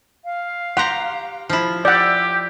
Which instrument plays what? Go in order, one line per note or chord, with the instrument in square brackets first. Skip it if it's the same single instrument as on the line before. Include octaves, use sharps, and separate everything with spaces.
[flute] F5
[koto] G4 A#5 [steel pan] F#5 C6
[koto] F3 E4
[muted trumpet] G4 [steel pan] D5 F#5 [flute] E6